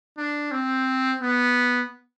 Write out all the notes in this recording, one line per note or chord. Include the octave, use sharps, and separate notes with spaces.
D4
C4
B3